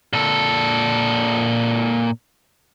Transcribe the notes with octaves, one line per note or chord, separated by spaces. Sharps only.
A#2 A4